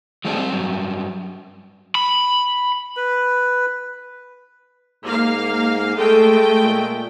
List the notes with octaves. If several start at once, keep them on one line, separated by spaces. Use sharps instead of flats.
F3 F#3 G#3 A3 C4 D4
G3 C4
G2 F#3
B5
B4
G#2 A#3 F5
G#3 A3 A4 G5
A#2